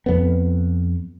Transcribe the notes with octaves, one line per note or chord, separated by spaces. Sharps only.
F2 B3